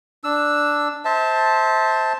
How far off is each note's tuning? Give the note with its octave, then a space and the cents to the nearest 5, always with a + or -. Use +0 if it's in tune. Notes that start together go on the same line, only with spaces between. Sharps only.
D4 +0 E6 +0
C5 +0 E5 -35 A5 +0